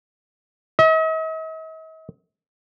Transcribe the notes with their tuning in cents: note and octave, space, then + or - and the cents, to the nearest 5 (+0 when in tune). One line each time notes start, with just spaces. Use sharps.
D#5 +45